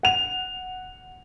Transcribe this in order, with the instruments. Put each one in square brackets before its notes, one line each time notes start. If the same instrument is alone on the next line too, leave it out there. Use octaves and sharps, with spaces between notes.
[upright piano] F#5 F7